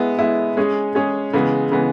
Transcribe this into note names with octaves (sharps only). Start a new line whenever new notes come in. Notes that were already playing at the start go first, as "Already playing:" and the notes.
Already playing: G#3 B3 E4
G#3 B3 E4
G#3 C#4 G#4
G#3 C#4 G#4
C#3 E3 G#3 B3
C#3 E3 G#3 B3